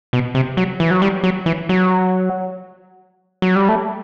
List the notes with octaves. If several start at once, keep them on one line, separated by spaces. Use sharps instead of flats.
B2
C3
F#3
E3
F#3
G3
F#3
E3
F#3
F#3
G3
A3